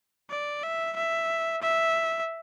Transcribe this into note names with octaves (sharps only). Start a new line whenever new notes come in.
D5
E5
E5
E5